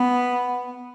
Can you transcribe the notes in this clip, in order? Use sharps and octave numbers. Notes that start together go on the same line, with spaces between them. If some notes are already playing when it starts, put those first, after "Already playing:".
Already playing: B3